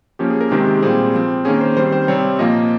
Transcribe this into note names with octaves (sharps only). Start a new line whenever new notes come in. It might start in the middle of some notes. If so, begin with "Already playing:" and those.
F3 A#3 C#4 G4
G#4
A#4
C3 D#3 G#3 C4 G4
G4
A#2 G3 C4 G#4
F3 C4
D#3 A#3 C#4 G#4
C5
D#3 G3 C4 C5
C5
C3 G3 C4 C#5
A#2 F3 A#3 D#5